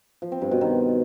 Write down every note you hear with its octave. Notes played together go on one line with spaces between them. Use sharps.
F3
C4
G2
B2
D#3